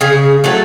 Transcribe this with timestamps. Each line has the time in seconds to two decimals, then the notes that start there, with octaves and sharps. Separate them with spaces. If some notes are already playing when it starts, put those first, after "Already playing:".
0.01 C#3 G#4
0.44 F#3 A3 A4